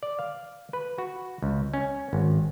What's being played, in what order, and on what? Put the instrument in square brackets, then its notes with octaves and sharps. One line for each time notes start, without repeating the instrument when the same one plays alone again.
[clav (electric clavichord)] D5
F5
B4
F#4
C#2
C#4
G#1